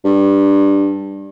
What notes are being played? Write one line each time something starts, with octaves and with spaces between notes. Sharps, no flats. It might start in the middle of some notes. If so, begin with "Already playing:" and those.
G2